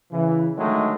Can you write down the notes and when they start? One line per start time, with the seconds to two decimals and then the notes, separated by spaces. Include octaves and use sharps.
0.12 C#3 E3
0.57 D3 D#3 F#3 G#3 A3